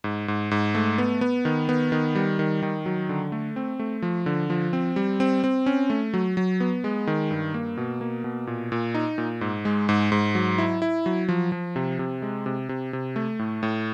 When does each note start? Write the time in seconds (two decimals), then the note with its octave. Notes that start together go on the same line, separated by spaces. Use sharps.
0.04 G#2
0.28 G#2
0.51 G#2
0.75 A3
0.98 B3
1.21 B3
1.45 D#3
1.69 B3
1.92 D#3
2.15 G3
2.39 D#3
2.63 D#3
2.86 F#3
3.09 D3
3.32 A3
3.56 C4
3.79 A3
4.02 F3
4.26 D3
4.50 F3
4.73 C4
4.96 G3
5.20 C4
5.44 C4
5.66 C#4
5.90 A3
6.14 F#3
6.37 F#3
6.60 B3
6.84 G#3
7.07 D#3
7.31 G2
7.54 A#3
7.77 B2
8.01 A#3
8.24 B2
8.47 A#2
8.72 A#2
8.94 D#4
9.18 A#2
9.41 G#2
9.65 G#3
9.89 G#2
10.12 G#2
10.35 F#3
10.58 E4
10.82 E4
11.06 F#3
11.29 F3
11.52 F3
11.76 C3
11.99 C3
12.22 G#3
12.46 C3
12.69 C3
12.93 C3
13.16 A3
13.39 A2
13.63 A2